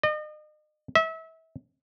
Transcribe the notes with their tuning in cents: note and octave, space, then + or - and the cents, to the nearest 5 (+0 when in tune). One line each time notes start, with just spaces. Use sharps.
D#5 -40
E5 -30